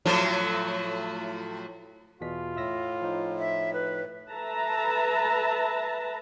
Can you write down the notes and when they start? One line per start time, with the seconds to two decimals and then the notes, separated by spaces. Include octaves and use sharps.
0.06 A2 F3 F#3
2.21 E2 B2 F4 B6
2.56 A2 E5 E6 A#6
3.02 F3 D#4
3.39 E5
3.73 B4
4.31 A4 B4 E5 A5 A#5